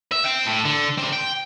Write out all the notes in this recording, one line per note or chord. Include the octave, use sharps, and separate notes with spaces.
E5
C5 G5
A2
D3
D3 C4
G5